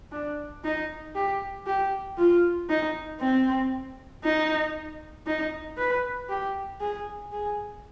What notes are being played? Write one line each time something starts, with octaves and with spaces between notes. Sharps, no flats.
D4
D#4
G4
G4
F4
D#4
C4
D#4
D#4
B4
G4
G#4
G#4